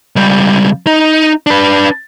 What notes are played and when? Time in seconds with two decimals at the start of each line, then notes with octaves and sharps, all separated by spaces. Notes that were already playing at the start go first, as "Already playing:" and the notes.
0.16 C#2 G3
0.87 D#4
1.47 D4 B4